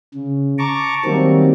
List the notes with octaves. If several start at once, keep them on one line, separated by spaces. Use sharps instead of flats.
C#3
A5 A#5 C#6 D6
D#3 F#3 G3 A#3 C4